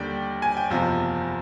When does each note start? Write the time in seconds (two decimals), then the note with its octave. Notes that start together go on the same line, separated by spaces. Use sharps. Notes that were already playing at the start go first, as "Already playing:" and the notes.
Already playing: D#2 D3 G3 D5 G5
0.42 G#5
0.57 G5
0.70 F#1 E2 C3 F3